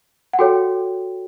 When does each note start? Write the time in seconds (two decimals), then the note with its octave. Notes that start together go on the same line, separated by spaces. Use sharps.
0.33 F#5
0.39 F#4 A4 C#5 G5